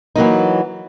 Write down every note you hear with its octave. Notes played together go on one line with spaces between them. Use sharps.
E3 F#3 A#3 D#4